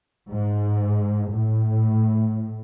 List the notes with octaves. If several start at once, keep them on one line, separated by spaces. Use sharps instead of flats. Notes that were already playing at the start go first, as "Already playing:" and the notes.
G#2
A2